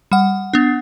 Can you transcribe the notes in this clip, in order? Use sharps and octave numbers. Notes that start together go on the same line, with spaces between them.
G3 F#5
B3 D4